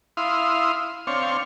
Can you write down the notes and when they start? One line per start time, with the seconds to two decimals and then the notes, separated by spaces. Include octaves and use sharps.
0.17 E4 F5 C6 D#6
1.07 C4 D4 C#5 F5